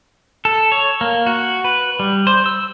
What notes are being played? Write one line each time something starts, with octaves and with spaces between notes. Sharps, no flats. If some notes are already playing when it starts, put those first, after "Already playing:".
A4
C#5
A#3
F#4
B4
G3
C5
E6